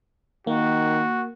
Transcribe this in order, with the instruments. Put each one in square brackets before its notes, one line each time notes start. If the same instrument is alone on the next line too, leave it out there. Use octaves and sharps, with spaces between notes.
[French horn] D#3 [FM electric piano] A#3 [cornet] F#4